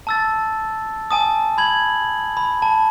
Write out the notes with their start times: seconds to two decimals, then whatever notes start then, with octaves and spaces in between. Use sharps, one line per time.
0.07 A5 E6 A6
1.11 G#5 A5 D#6
1.58 B5 G#6 F#7
2.37 B5
2.62 A5